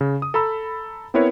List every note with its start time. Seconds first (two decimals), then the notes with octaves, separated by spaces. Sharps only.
0.01 C#3
0.22 D#6
0.34 A4 A#5 B5 E6
1.14 B3 C4 E4 A#4 B4 C#5